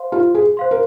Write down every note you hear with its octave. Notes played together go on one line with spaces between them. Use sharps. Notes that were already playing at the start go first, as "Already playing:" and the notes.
Already playing: C5 F5 C6
F4
G#4
C5 F5 C6
A#4